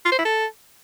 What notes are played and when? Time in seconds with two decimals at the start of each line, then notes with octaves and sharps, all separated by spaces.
0.05 F4
0.12 C5
0.19 E4
0.25 A4